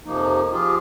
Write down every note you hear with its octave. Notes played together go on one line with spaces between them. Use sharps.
F2 C3 F3 A#3 D#4
F3 F4 G4 G#4